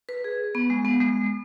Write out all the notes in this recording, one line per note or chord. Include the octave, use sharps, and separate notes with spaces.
B4
G#4
B3
G#3
B3
G#3